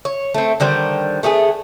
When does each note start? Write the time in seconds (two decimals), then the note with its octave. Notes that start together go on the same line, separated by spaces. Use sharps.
0.05 C#5
0.34 A3 C4
0.60 D3 D#3 G3 C5
1.23 A3 B3 G4 G#4